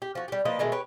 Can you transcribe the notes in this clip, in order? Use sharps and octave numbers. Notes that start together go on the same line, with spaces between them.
G4
F3 F#4
G3 G4
F3 A#3 B4 D#5
B2 D#3 G#3 A3
G4 B4 C#5